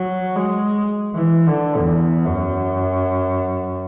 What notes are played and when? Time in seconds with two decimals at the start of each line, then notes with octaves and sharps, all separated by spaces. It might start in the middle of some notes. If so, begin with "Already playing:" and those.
Already playing: F#3
0.35 G#3
1.15 E3
1.47 D3
1.78 E2
2.26 F#2